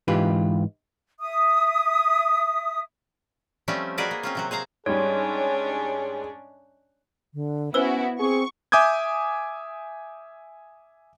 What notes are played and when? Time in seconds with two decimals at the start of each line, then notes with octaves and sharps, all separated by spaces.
0.08 G#2 E3 F4 G4 B4
1.19 E5 D#6
3.68 F3 G3 A3 C4 C#4 G4
3.98 F#4 G#4 A#4 B4 D5 D#5
4.11 A#3
4.23 C4 C#4 F4
4.35 C3 F#3 F#4
4.51 G#4 C5 F5 A#5
4.86 G#2 G3 C#4 D4 G#4 C#5
7.34 D3
7.74 B3 C#4 E4 F#4 B4 C5 E6
8.19 C4 G#4 C#6
8.72 E5 G#5 D6 D#6 G6 G#6